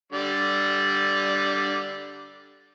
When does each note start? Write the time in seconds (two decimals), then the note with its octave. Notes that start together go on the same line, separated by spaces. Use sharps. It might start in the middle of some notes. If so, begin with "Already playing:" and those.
0.13 D3 G3 D5